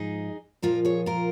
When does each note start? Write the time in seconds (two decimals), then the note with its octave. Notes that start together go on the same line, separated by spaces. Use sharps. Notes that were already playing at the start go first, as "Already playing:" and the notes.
Already playing: G#2 F3 D#4 G#4
0.62 A#2 F3 F4 A#4
0.85 G#4 C#5
1.06 F4 A#4